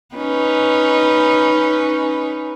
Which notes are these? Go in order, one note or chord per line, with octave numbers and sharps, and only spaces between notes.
C#4 D#4 B4